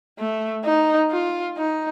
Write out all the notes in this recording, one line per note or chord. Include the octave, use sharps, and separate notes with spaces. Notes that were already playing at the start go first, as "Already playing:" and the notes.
A3
D#4
F4
D#4